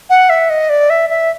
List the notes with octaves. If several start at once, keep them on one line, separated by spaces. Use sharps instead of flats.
F#5
E5
D#5
D5
E5
E5